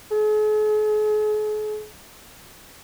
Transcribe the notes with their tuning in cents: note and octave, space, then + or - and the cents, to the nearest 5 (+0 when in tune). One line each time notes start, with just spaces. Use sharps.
G#4 +45